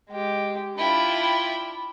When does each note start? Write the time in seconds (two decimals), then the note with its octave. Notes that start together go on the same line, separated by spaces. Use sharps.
0.10 G#3 G4
0.77 D4 E4 F4 G5 B5